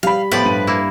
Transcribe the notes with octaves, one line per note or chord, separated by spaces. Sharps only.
G3 F5 B5
A2 F3 B3 B4 D5
G2 D#7
A#3 E4